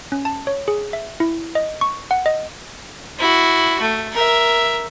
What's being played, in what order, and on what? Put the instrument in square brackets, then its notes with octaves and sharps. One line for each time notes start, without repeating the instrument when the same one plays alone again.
[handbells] C#4
A5
C#5
G#4
E5
E4
D#5
C#6
F#5
D#5
[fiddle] E4 F#4
A3
A#4 E5